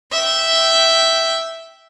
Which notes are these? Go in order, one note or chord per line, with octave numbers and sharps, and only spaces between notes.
E5 G5